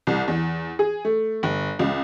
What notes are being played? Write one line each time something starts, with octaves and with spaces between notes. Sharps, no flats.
C2
E2
G#4
A3
G1
C#2